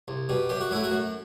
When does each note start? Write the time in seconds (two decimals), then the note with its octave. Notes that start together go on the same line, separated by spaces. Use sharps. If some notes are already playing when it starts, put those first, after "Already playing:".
0.08 C2
0.29 B2 G3
0.49 F#2 G4
0.61 F#4
0.71 F#3 A3 E4
0.83 F#4
0.91 F#2